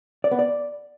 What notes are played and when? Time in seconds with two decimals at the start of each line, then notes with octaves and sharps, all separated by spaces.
0.24 D5
0.31 B3
0.39 D5